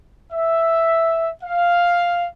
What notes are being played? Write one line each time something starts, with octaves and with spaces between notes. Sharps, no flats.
E5
F5